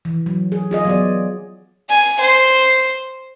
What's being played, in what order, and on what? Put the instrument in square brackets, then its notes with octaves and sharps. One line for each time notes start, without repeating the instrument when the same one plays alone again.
[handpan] E3
F#3
G#4
F4 G#4 D#5
F#3 B3 D5
[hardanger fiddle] G#5
C5